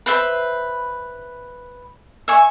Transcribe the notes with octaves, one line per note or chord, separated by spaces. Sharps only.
B4 C5 E5 B5
E5 G#5 C#6